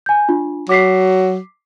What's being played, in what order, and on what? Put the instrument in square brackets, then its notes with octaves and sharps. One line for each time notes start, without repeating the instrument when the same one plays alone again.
[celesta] G#5 G6
D4 F4
[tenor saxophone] F#3 [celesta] D6 B6 C7